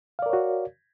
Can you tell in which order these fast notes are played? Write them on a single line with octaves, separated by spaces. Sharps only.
F5 D5 A#4 C#5 F#4